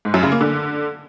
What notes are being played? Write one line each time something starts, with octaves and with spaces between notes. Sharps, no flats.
G#2
F#2
C#3
A#3
D3